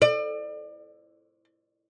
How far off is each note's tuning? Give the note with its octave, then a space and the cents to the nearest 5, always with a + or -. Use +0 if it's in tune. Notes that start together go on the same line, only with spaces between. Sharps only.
D5 +35